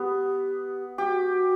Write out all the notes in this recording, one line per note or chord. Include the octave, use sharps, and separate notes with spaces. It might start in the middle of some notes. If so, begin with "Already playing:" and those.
Already playing: B3 G4
F#4 G4